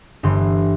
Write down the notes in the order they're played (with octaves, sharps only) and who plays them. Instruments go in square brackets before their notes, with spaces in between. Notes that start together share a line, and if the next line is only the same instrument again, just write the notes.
[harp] G1 G2 E3 C6